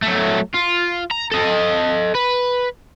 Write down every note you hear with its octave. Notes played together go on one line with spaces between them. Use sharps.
F#3 A3
F4
A#5
A4 D#5
B4